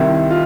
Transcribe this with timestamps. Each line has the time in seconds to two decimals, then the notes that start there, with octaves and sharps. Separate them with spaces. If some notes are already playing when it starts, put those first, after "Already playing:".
Already playing: C2 C3 D#3 E4
0.31 F4